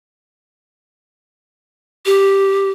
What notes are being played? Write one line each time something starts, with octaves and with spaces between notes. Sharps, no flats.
G4